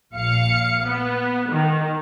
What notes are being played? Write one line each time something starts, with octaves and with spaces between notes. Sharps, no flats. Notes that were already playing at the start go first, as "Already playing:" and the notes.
A#1 F5 C#7
B3
D#3